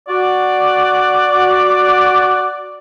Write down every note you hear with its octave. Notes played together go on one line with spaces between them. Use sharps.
F#4 D5